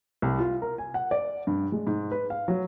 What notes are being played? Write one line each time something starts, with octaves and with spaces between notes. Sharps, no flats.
C2
F4
A#4
G#5
F#5
D5
G2
G#3
G#2
B4
F5
F#3